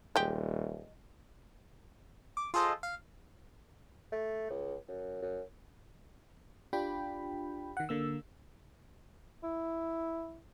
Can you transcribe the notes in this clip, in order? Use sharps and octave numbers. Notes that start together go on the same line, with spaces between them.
D#1 G#3 G4
D6
F4 G#4 A4 C5 D#5
F5
A3
C#2
F#2
F#2
D4 F4 G4 G5 B5
D#3 F#5
D3 A#3 E6
E4